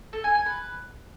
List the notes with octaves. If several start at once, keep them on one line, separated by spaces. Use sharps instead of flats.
A4
G#5
G#5
B4